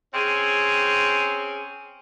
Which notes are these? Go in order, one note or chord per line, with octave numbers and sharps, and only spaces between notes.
C4 C#4 G#4